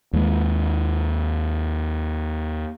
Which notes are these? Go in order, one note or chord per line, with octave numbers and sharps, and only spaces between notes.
D#2 G#3